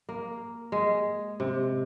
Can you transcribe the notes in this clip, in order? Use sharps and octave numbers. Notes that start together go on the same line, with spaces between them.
A#3
G#3
C3